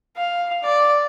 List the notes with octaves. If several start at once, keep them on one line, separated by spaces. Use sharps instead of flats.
F5
D5